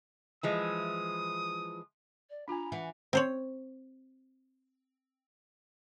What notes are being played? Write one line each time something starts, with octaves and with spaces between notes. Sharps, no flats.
E3 F3 G#3 D#6
D5
D4 F4 G#5 A#5 B5
E3 F#5
C4 C5 C#5